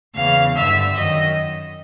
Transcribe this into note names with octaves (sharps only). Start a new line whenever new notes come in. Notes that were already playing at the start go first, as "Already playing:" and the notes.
E2 C#3 E3 F5
G2 D3 E5
F#2 D#3 D#5